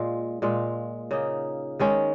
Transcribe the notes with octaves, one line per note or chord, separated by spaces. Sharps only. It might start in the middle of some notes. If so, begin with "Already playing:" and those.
Already playing: A#2 G#3 F4
A#2 G#3 F4
C#3 A#3 D#4
D#3 G#3 C#4